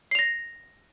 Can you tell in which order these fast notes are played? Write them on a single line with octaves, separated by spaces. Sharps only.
C7 F7 A#6